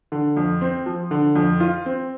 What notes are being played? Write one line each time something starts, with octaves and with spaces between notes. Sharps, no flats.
D3
F2
C4
F3
D3
F2
F4
C4